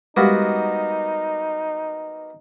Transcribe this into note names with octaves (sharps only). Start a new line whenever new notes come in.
G3 G#3 A#3 B3 D#4 F#4 G4